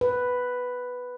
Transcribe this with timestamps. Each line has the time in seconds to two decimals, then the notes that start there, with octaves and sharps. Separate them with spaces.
0.01 B4